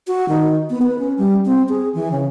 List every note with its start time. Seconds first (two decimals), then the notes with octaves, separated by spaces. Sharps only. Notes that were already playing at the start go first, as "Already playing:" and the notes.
0.07 F#4
0.28 D#3
0.70 B3
0.82 B4
0.99 C#4
1.18 G3
1.45 C4
1.69 G#4
1.94 E3
2.11 C#3